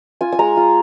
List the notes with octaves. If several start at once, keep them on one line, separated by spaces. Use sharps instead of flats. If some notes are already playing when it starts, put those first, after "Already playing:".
F4 G#5
G#5
G#3 A#5
F4